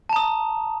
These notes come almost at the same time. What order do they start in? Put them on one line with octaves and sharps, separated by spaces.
A5 A#5 D#6